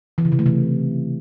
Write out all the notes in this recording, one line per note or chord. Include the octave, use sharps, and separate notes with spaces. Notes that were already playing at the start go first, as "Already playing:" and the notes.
E3
C#3
C3
A3
C3